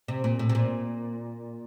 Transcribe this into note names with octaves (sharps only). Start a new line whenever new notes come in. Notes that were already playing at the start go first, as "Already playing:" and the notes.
C3
A#2
A2
C3
A#2